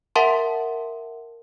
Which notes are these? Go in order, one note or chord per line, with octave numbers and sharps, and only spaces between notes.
A#4 E5 F#5 A5 C6